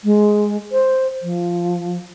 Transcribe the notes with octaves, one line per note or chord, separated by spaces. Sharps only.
G#3
C5
F3